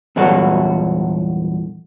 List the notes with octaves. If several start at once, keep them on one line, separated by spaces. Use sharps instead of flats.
E2 G2 A#2 F#3 F#4 A4